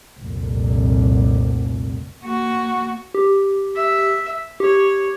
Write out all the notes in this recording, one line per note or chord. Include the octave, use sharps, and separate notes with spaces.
F1 C2 A#2
A#3 F#4
G4
E5
G4 C#5